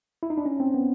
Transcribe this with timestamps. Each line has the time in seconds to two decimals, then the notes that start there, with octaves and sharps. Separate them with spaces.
0.23 E4
0.30 D#4
0.38 D4
0.46 C#4
0.60 C4
0.74 B3